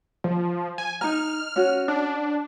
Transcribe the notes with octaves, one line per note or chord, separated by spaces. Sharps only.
F3
G#5
D#4 A#5 F6
C#4 F#4
D4